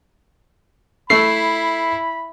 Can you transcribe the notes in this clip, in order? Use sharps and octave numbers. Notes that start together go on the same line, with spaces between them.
A3 E4 B5 C7